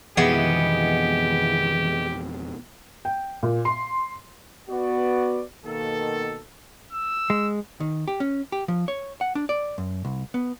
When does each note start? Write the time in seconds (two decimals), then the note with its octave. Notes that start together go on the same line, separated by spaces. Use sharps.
0.17 F2 B2 D#3 E3 G#3 B3 G4
3.05 G5
3.43 A#2
3.65 C6
4.68 B3 F#4 D5
5.66 B2 D#3 A#3 A4
6.93 E6
7.30 G#3
7.80 D#3
8.08 G4
8.20 C#4
8.52 G4
8.68 F3
8.88 C#5
9.21 F#5
9.35 D4
9.49 D5
9.78 F#2
10.05 C2
10.34 B3